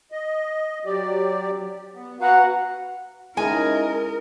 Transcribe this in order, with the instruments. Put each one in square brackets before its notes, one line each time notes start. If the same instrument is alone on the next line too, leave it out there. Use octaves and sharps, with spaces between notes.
[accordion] D#5
F#3 G4 D5
B3
[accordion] F#4 B4 F5 [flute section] F#5 A#5
[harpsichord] G#3 [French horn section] C#4 D#4 E4 [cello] A#4 [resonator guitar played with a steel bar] G#5